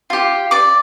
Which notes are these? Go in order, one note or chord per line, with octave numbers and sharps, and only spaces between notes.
F4 G4
D5 D6